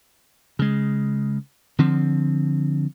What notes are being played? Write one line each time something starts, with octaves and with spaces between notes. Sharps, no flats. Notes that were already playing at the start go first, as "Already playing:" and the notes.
C#3 G#3
D3 F3 C4